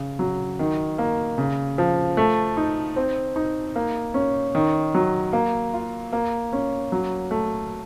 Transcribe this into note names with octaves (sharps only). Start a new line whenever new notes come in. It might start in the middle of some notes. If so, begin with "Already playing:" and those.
Already playing: C#3
F#3
D#3
A#3
C#3
F3
A3
D#4
C4
D#4
A#3
C#4
D#3
F#3
A#3
F4
A#3
C#4
F#3
A3